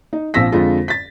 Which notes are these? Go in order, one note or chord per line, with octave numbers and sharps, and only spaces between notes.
D#4
A#1 F3 C4 E6 A#6 B6
F2 D3 G#3 F4 A4
A6 B6